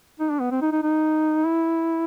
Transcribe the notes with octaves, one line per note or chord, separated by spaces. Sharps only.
D#4
D4
B3
C4
D#4
D#4
D#4
E4